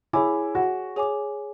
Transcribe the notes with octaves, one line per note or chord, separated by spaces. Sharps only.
E4 G#4 C#5 G#5 D6
F#4
G#4 C#5 G#5 D6